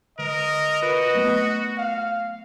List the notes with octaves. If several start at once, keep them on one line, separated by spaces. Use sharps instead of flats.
D3 A#4 D#5
F4 F#4 A#4 B4
F#3 A3 B3
F5